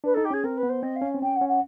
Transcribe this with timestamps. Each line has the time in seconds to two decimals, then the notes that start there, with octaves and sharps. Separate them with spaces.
0.04 D4 B4
0.14 D#4 A4
0.24 G4
0.30 C#4 G#4
0.44 C4 A#4
0.57 B4
0.63 B3
0.69 C5
0.82 C4 D#5
0.96 F5
1.02 C#4
1.14 C4
1.22 C#4 G5
1.35 F#5
1.41 C#4
1.48 F#5